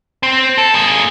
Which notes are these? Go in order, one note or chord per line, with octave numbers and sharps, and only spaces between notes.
C4
A4
A#3 G#4